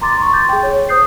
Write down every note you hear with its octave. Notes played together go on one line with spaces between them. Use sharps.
A#5 C6 D6 A6
C6 C#6
D6 G6 A6
G#4 G5
G#4 C#5
C5 D#6 G6 C7